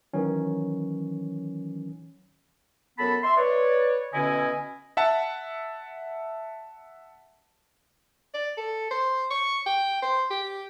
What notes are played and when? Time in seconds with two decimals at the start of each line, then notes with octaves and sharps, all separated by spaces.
0.13 D#3 E3 F#3 C#4
2.99 F#2 B3 A4 A5 B5
3.24 E5 C6
3.37 B4 C#5 D5
4.14 B2 D3 C#4 E4 D#5 G#5
4.97 E5 F#5 A5
8.34 D5
8.57 A4
8.91 C5
9.31 C#6
9.66 G5
10.02 C5
10.31 G4